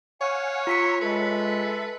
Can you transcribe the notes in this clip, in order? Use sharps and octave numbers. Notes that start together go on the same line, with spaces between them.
C#5 F5 F#5 G#5
F4 A#5 C6 E6 B6 C#7
G#3 A4 B4 E5